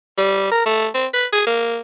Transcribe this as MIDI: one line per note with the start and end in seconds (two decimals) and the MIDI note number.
0.18 0.49 55
0.51 0.61 70
0.66 0.87 57
0.95 1.07 60
1.14 1.26 71
1.33 1.44 68
1.47 1.81 58